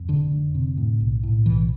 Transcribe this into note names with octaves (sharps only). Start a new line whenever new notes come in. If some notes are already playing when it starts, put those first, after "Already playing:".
Already playing: F2
F1 D3
F1
C3
A2
B1
A2
B1 E3